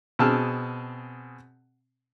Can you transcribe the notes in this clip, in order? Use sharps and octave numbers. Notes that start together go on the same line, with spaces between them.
B2 C4 G#4 A5 E6 F6